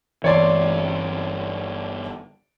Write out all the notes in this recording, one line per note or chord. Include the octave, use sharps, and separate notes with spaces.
G1 E3 C#5 D5 C6